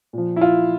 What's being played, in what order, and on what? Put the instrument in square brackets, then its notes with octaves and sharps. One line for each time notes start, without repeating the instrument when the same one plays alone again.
[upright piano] A#2 F3
E4
F4